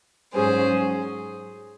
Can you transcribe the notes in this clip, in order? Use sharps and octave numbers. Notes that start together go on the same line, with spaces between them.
G#2 F#3 C#4 G#4 C5